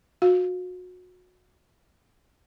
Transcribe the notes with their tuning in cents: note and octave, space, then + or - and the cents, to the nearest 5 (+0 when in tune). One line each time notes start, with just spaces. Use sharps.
F#4 -30 F5 +0